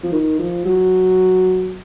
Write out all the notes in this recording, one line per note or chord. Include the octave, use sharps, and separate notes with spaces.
F3
D#3
F3
F#3